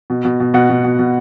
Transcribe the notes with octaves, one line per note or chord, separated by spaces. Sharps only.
B2
B2
B2
B2 F#5
B2
B2
B2